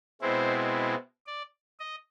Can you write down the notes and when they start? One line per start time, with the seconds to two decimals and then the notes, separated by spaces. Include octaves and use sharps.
0.21 B2 G#3 C4 E4 C5
1.27 D5
1.80 D#5